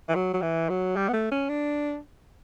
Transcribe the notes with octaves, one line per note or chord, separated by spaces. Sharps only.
E3
F#3
F#3
E3
F#3
G3
B3
A3
C#4
D4